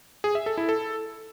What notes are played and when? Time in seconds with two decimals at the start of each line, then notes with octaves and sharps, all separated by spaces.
0.24 G#4
0.35 E5
0.46 A4
0.57 E4
0.69 A4